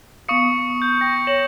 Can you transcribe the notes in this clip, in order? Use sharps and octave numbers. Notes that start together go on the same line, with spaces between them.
B3 F5 C#6 D#6 C#7
G6
G5 A#6
C#5 A#6 E7 F#7